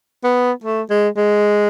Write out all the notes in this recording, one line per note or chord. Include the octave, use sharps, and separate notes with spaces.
B3
A3
G#3
G#3